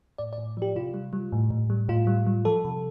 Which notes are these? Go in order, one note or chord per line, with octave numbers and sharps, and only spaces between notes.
A2 D5
D5
A2
F3 G4
C3 F4
G3
G3
A2
A2
G3
A2 F4
G3
G3
F3 A4
C3